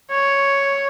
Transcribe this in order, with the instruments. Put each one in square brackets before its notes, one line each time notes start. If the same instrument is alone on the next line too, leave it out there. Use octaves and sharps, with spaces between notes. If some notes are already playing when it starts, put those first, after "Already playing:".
[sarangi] C#5